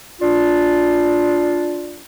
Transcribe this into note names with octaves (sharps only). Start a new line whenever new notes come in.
D4 F4